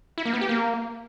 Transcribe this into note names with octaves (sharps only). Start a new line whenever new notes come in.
E4
A#3
B3
G4
A#3